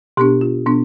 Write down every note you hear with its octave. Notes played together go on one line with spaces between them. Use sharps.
B2 B3 D4 G4
F4
B2 B3 D4